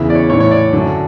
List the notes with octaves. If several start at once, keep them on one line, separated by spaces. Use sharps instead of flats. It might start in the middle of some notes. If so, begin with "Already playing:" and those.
Already playing: E2 C#3 E3 E4 E5
D5
C#5
A2 E3 C#5
C#5
D5
F#2 D3 F#3